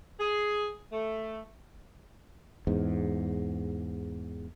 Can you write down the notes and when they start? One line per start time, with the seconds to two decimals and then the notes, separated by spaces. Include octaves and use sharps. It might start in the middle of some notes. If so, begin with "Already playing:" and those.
0.19 G#4
0.92 A3
2.67 E2 G#2